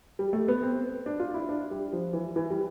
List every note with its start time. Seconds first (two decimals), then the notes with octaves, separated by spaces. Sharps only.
0.19 G3
0.33 A3
0.48 B3
0.63 C4
1.06 D4
1.20 F4
1.34 E4
1.49 D4
1.71 G3
1.93 F3
2.13 E3
2.36 E3
2.50 G3